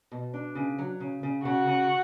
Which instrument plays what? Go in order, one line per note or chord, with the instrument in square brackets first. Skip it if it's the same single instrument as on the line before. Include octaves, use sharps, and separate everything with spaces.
[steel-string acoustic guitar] B2
D4
C#3
F#3
C#3
C#3
[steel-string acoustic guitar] C#3 [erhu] F#4
[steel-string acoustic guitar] C#3